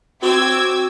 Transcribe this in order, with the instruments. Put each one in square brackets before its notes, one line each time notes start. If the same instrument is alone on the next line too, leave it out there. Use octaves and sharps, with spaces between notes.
[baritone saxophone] C4 [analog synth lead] F#4 [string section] D6 E6 G#6